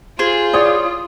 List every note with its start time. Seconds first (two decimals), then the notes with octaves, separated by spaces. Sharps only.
0.19 F4 G#4 C5
0.53 E4 C#5 D5 C6 D#6